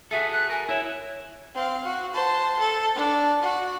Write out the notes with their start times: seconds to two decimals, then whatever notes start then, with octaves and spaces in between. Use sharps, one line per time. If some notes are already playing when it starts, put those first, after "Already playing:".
0.11 F#4 G#4 A4 E5
0.33 F#6
0.50 A#4 G#5
0.69 E4 C#5 E5
1.55 C4 F5
1.84 F#4
2.14 C5 A5
2.59 A4
2.95 D4
3.42 F#4